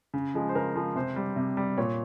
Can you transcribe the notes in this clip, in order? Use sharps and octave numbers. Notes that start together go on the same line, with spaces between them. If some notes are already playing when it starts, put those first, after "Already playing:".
C#3
F3 G#3
C5
C#3 A#4
F3 G#3
C3 C5
G3
C3
G3
A#2 C#5